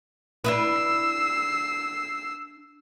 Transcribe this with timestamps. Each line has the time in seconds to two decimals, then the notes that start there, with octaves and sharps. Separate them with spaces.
0.44 D4 E4 B4 E6 C7